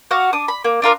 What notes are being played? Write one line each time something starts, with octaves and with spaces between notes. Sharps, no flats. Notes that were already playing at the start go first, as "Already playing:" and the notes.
F#4 F5 F#5
D4 D#6
B5
A#3
D4 F4 A#4 F5